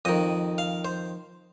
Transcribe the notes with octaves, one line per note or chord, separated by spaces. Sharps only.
F2 D#3 D#5
F5
C5